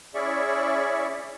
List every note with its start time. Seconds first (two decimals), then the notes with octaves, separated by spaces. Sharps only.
0.15 C#4 E4 G#4 D5 E5 C#6